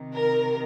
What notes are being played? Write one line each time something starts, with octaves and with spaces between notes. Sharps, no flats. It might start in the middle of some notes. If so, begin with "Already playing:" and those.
Already playing: C3 D#3
A#4